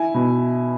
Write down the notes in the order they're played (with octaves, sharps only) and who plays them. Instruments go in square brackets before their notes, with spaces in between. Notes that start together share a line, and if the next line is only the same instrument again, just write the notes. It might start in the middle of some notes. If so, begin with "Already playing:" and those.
Already playing: [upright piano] E4 G#5
B2